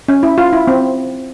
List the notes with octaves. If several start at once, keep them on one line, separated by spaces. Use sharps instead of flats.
C#4
E4
F4
E4
C4